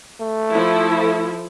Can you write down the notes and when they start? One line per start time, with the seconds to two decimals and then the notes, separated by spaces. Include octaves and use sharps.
0.21 A3
0.52 F3 E4 A4